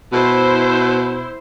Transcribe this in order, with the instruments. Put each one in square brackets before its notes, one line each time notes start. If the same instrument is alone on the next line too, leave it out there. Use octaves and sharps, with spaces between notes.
[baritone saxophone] B2 [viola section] E4 C5